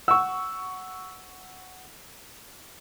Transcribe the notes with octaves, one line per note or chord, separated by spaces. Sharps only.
F#5 C#6 E6